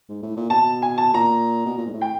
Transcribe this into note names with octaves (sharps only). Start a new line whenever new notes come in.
G#2
A2
A#2
B2 A5
G#5
A5
A#2 A#5
B2
A#2
G#2
A2
G5